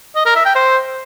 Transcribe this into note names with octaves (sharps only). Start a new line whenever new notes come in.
D#5
A#4
E5
G5
C5